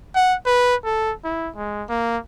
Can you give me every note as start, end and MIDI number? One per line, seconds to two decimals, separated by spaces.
0.15 0.35 78
0.46 0.76 71
0.84 1.13 69
1.24 1.50 64
1.55 1.83 56
1.89 2.18 58